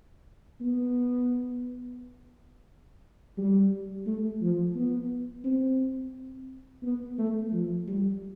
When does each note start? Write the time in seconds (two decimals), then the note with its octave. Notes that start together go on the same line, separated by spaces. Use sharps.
0.61 B3
3.38 G3
4.06 A3
4.41 F3
4.75 B3
5.44 C4
6.83 B3
7.18 A3
7.52 F3
7.88 G3